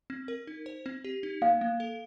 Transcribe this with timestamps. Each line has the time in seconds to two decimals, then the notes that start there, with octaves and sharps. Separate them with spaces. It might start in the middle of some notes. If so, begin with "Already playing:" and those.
0.10 C4
0.28 A#4
0.47 D#4
0.66 C5
0.86 C4
1.04 G4
1.23 D#4
1.42 A#3 F5
1.61 A#3
1.80 A4